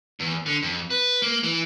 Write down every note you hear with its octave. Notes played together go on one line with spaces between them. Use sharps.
E2
D3
F2
B4
A#3
E3